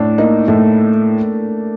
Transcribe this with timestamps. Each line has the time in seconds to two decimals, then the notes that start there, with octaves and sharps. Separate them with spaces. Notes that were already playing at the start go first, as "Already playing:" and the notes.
Already playing: A2 D4
0.18 A#3 D#4
0.48 A2 A3